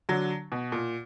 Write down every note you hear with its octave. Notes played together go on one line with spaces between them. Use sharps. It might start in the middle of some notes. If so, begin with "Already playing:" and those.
D3 F#3
B2
A#2